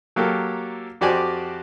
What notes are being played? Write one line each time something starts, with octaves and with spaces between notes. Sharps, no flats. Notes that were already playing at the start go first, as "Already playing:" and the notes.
F#3 A#3 G4 A4
F2 F#4 G4 C5 D5 G#5